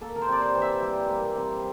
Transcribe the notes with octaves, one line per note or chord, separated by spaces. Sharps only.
A#3 A4
A#4
C5
C3 D5
C5
E3
E5
G3
A#3
C3